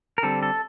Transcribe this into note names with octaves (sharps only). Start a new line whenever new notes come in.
A#4
D3 G3 C4 A4
A4